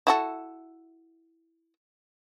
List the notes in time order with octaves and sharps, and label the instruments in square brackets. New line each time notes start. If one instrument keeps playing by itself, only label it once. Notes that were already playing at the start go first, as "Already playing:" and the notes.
[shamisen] E4 F#4 A4